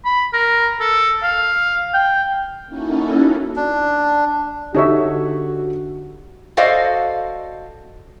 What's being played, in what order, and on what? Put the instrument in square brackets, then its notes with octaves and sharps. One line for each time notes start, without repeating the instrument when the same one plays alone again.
[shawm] B5
A#4
A4
F5
G5
[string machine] A#3 C#4 D#4 E4 F#4 A4
[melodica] D4
[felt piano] D3 G4 A4 [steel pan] D#4 C#5 E5 [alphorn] F#4
[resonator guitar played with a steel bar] F#4 A4 C5 D5 D#5 F5